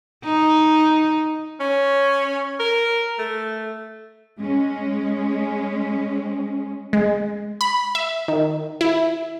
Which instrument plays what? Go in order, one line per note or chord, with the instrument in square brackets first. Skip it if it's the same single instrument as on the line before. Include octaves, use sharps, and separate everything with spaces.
[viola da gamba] D#4
[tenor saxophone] C#4
A#4
A3
[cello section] G#3 C#4
[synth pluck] G#3
B5
E5
D#3
E4